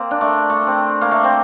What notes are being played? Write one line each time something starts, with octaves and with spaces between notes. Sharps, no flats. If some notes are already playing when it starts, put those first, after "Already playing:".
Already playing: A#3 C4
D4
A3
A3
C4
A#3
A3
C4